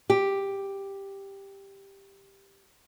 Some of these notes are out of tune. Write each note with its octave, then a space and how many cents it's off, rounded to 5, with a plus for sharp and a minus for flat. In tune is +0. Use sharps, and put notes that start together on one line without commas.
G4 +5